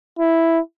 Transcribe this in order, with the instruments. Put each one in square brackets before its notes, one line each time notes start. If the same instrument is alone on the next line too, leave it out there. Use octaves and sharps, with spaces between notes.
[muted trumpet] E4